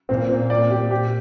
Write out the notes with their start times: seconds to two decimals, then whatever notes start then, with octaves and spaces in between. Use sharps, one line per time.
0.09 A#2 C4
0.30 C4
0.50 D5
0.70 G4
0.91 G4